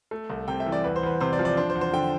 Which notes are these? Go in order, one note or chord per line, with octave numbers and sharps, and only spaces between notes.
A3
C2
C3 G5
E5
E3
D5
E2 B4
C5
E2 B4
C3 C5
D5
F3
D5
D4 C5
C5
E2
C5
D3 G5